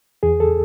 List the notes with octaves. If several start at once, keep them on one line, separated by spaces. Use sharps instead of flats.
E2 G#4
A4